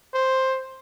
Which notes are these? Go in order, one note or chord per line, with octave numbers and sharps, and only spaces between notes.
C5